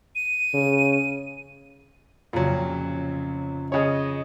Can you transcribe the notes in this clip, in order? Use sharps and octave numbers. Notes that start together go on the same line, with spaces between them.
D#7
C#3
F2 A#2 C#3 F#3
C#3 C#5 D#5